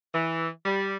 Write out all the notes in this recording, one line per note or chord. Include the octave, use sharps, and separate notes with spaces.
E3
G3